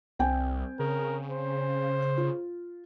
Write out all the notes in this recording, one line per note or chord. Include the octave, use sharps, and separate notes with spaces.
C2 C4 G5 G#5
C#3 A#4
C5
F4